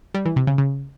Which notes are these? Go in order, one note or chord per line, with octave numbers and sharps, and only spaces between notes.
G3
E3
C3
C#3
C#3